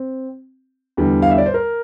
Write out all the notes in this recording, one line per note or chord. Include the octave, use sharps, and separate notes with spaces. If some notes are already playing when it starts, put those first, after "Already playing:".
Already playing: C4
E2 D3 G3
F5
E5
D5
C5
A#4